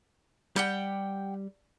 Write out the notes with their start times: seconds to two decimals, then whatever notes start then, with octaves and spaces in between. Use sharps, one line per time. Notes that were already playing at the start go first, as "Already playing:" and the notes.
0.56 G3 G4 F#5 G5